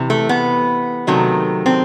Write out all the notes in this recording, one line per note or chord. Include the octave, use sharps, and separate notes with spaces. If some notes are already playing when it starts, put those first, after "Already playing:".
Already playing: C3 E3
A3
B3
C3 D#3 F#3 A3
C4